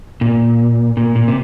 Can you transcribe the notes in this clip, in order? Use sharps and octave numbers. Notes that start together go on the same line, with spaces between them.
A#2
A#2
A#2
C3